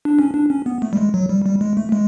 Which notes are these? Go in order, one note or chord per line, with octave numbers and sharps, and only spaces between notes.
D4
C#4
D4
C#4
B3
A3
G3
G#3
F#3
G3
G3
G#3
A3
G#3